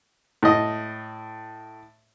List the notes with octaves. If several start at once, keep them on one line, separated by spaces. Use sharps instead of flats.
A2 D#5